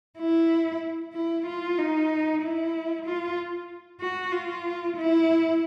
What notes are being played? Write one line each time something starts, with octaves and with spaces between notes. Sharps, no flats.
E4
E4
F4
D#4
E4
F4
F#4
F4
E4